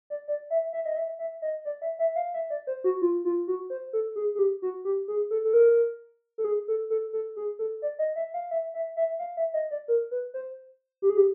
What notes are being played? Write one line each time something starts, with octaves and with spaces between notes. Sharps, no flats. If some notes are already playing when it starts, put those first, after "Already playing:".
D5
D5
E5
E5
D#5
E5
E5
D#5
D5
E5
E5
F5
E5
D5
C5
F#4
F4
F4
F#4
C5
A4
G#4
G#4
G4
F#4
G4
G#4
A4
A4
A#4
A4
G#4
A4
A4
A4
G#4
A4
D5
D#5
E5
F5
E5
E5
E5
F5
E5
D#5
D5
A#4
B4
C5
G4
G#4
G4